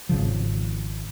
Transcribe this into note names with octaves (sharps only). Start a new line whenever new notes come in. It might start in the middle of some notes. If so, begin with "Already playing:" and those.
G#1 C#3 F3